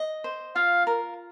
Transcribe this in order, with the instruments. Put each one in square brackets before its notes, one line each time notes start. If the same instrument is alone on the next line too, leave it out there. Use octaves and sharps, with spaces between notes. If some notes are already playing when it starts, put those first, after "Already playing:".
Already playing: [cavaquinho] D#5
C5
[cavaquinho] F4 [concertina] F5
[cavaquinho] A#4